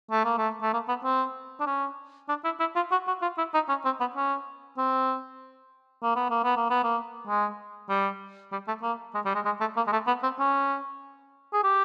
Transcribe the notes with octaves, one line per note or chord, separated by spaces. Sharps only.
A3
A#3
A3
A3
A#3
B3
C4
D4
C#4
D4
E4
E4
F4
F#4
F#4
F4
E4
D#4
C#4
C4
B3
C#4
C4
A#3
B3
A#3
B3
A#3
B3
A#3
G#3
G3
G3
A3
A#3
G#3
G3
G#3
G#3
A3
A#3
G#3
A3
B3
C4
C#4
G#4
G4